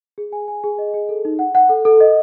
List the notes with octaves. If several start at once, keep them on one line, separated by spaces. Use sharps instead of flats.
G#4
G#5
G#5
G#4
D#5
G#4
A4
D#4
F#5
F#5
A4
A4
D#5